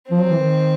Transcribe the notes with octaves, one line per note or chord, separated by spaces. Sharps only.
F3 C4
F#3
E3
D#3